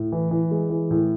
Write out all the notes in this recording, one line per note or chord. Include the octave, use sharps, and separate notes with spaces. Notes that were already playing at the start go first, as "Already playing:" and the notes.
Already playing: A2
E3
E3
G#3
E3
A2